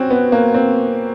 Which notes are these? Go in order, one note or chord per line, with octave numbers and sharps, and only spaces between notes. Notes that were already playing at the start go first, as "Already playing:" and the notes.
Already playing: C4 C#4 F#4
B3
A#3
C4